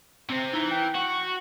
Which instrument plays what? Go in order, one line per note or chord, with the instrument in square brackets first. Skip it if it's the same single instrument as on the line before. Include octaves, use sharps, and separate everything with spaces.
[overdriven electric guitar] C3 C4
[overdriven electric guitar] E3 [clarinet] D#4
[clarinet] G5
[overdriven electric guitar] F#4 [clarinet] C#6